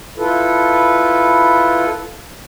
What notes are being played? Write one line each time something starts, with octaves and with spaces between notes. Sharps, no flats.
E4 F4 A4 B4